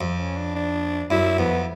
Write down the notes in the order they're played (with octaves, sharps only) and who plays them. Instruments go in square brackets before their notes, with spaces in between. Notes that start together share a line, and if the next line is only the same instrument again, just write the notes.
[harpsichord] F2 [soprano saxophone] C4
[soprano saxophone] C#4
D4
D4
[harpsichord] F#2 [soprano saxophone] E4
[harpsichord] F2 [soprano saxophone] B3